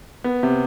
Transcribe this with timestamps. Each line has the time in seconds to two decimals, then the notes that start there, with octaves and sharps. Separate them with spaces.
0.24 B3
0.43 C3